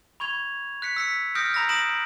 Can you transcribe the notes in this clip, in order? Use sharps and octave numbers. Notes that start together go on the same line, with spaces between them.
B5 C#6 G#6 F7
F#6 B6 C#7
E6 B6 C#7
D#6 F6 G6 A#6 C#7 D7
A#5 B5 E6 A#6
D#6 A#6 D7 E7 F#7